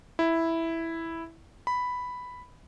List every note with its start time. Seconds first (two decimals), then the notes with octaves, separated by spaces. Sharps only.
0.19 E4
1.67 B5